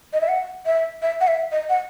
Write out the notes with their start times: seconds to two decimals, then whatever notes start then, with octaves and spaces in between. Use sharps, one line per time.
0.13 D#5
0.21 E5
0.28 F#5
0.66 E5
1.02 E5
1.21 F#5
1.28 E5
1.52 D#5
1.70 F#5